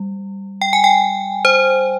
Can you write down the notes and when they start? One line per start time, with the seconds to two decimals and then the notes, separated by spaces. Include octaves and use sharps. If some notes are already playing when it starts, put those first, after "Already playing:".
Already playing: G3
0.61 G5
0.73 G#5
0.84 G5
1.45 C5